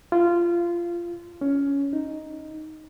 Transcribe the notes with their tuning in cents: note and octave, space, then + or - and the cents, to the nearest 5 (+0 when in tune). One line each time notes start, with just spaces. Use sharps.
F4 -20
C#4 +15
D#4 +0